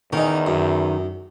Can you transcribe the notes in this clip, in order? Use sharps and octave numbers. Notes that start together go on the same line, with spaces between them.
E2 D#3 C#4 D#4
F#2